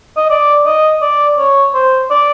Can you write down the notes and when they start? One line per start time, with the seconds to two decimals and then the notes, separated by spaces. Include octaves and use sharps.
0.17 D#5
0.30 D5
0.66 D#5
1.02 D5
1.38 C#5
1.74 C5
2.10 D5